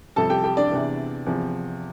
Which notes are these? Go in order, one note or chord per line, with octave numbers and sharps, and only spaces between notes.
F2 C3 G3 A4 A5
G4 G5
G4 G5
D4 D5
E2 C3 E3
E2 C3 F3 C4